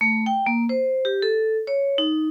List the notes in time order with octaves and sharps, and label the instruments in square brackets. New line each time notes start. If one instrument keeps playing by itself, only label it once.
[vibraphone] A3
G5
A#3
C5
G4
A4
C#5
D#4